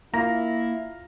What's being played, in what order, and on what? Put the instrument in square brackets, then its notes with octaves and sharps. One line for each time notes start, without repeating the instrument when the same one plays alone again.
[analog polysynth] A#3 [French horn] E4 [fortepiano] F4 A#5